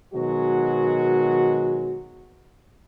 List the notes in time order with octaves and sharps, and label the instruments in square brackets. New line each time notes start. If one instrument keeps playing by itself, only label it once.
[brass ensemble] B2 D#3 F#3 G#3 F#4